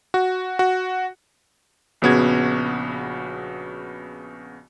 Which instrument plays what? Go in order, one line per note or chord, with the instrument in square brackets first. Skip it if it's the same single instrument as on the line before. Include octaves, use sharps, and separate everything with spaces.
[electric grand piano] F#4
F#4
A#1 C#3 B3 F#4 G#6